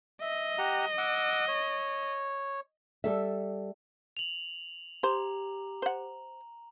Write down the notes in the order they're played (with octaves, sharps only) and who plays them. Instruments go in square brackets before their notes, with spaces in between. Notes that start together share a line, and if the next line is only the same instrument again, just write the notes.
[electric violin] D#5 [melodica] E5
[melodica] G4 F#5 A#5
F#5 D6 E6
C#5
[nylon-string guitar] G3 A4 E5
[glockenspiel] F7 F#7
[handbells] G4 [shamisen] C5 [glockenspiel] A#5
[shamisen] C5 F#5